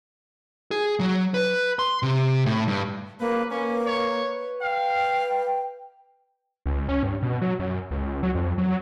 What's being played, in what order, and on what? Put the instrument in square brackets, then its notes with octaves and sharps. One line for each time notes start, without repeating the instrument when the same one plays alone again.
[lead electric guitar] G#4
F#3
B4
C6
C3
A2
G2
[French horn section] C#3 F3 F#3 [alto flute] A#3 [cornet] B4
[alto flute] A#3 [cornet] C#4 [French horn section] B4
[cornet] C#5
[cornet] F5 [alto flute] G5
[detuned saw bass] C#2
C#4
G2
B2
F#3
F#2
C#2
F#3
F2
F#3